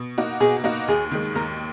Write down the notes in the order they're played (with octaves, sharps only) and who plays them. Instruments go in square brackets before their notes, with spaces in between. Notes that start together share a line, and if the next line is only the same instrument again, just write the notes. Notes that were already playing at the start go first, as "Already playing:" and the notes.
Already playing: [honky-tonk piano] B2
A#3 D#4 F#4
[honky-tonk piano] B2 [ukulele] G#4
[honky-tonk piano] A#3 D#4 F#4
[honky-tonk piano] D#2 [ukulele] G#4
[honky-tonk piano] D#3 G#3
[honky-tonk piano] D#2 [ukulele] A#4